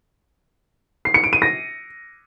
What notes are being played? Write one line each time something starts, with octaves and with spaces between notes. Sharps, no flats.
C7
C#7
D7
D#7
A#6